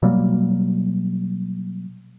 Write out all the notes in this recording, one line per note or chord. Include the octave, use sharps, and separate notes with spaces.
B2 F#3 G3 A#3